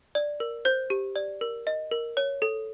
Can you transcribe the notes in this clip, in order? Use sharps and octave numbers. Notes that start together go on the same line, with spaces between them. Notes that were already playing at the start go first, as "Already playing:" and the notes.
D5
A#4
C5 G6
G4
D5
A#4
D#5
A#4
C#5
A4